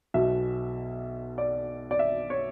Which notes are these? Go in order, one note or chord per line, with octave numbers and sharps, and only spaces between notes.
B1 B2 E5
D5
D5
E5
C#5